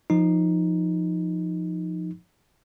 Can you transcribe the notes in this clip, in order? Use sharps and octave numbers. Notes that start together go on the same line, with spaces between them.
F3 D#4